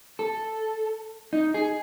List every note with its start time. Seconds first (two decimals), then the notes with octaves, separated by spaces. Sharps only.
0.19 A4
1.33 D#4
1.54 G#4